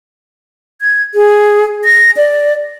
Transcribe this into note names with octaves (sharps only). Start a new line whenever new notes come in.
G#6
G#4
A#6
D5